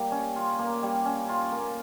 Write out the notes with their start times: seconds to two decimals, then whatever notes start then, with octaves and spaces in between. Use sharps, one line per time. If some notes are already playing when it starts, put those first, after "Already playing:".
Already playing: G3 A#3
0.11 C#4
0.36 F4
0.59 A#3
0.82 G3
1.05 C#4
1.29 F4
1.52 A#3